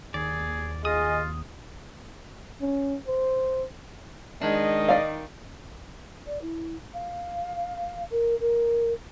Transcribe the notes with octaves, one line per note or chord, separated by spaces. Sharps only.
D#2 G#4 D5
F4 G#4 D#5 D#6
C#4
C5
D#3 G#3 D4 D#5
D5 F5
D5
E4
F5
A#4
A#4